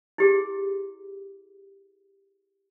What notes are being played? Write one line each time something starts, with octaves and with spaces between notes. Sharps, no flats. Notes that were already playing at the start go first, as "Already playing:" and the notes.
E4 G4 G#4